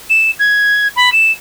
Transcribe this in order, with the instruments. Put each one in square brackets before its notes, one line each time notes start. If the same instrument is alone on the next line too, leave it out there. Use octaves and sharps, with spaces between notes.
[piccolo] E7
G#6
B5
E7